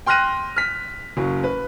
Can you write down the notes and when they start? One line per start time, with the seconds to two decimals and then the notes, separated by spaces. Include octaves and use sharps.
0.06 G5 C6 F6 F#6 A#6 D#7
0.56 F6 B6
1.17 F#1 F#3
1.44 B4